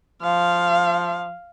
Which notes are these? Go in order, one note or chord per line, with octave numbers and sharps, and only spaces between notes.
F3 F5